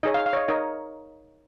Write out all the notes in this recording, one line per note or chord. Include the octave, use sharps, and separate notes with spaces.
D#4 G#4 C#5 D#5
F5
F5
C#5
D#5
D#4 A#4 C#5 D#5